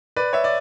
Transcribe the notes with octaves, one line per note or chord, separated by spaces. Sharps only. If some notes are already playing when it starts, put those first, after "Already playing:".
B4 D5
C#5 E5
D5